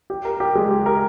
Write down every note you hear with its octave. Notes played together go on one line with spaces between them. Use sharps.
G4
A#4
G4
G#3
G4
A#4